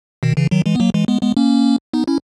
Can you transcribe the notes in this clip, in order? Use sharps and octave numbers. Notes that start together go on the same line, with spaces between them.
B2 D#3
C#3 E3
D#3 F#3
E3 G#3
B3
F#3 A#3
E3 G#3
G#3 B3
G#3 B3
A#3 C#4
B3 D#4
C#4 E4